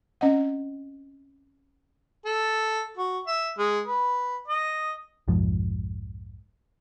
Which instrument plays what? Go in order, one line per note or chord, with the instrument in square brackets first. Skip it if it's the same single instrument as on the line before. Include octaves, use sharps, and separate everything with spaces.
[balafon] C4 C#4 D#5 F#5
[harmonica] A4
F#4
E5
G#3
B4
D#5
[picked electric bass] B1 F2 G#2 F3